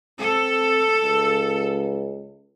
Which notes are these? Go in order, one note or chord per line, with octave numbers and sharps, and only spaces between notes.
C4 A4
C#2